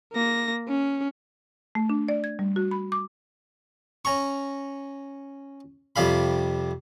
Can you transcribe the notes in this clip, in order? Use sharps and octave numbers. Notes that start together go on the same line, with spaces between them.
A#3 A#6
C#4
A3
D4
D5
G#6
G3
F#4
B5
D6
C#4 A#5 C#6
F2 C3 G3 F5 B5